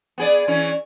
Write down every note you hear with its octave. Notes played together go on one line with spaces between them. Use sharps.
B3 G#4 D5
E3 C#4